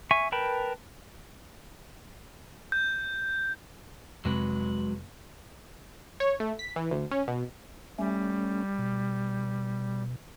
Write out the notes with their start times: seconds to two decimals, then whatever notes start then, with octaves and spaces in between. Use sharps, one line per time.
0.11 E5 G#5 C#6
0.32 A#4 B4 G5 A5 B5
2.72 G6
4.25 F2 C3 F#3 G#3 C4 B4
6.20 C#5
6.40 A3
6.59 B6
6.76 E3
6.91 D2
7.11 C#4
7.28 B2
7.98 G3 A3 C#4
8.79 B2